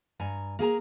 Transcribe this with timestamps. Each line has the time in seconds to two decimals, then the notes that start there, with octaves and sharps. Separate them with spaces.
0.20 G2 G#5 A#5
0.59 A#3 G#4 G#5 A#5